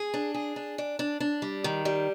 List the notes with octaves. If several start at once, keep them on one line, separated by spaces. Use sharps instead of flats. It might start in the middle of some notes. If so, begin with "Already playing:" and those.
Already playing: G#4
D4
G#4
D4
D4
D4
D4
G3
D#3
G3